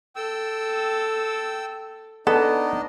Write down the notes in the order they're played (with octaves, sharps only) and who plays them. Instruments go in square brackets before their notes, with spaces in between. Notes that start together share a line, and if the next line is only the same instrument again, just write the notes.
[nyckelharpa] A4 [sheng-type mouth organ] G5 E6
[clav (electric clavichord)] B3 [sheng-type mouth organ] D4 D#4 D#5 [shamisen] A4